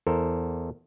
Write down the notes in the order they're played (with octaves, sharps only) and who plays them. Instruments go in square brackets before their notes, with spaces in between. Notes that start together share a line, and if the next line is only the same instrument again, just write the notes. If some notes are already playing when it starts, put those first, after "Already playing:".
[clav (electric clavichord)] E2 A4 A#4 C5